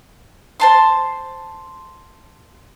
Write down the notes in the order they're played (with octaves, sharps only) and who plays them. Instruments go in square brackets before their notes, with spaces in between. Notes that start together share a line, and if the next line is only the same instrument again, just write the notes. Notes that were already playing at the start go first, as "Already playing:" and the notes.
[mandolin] C5 A5 C6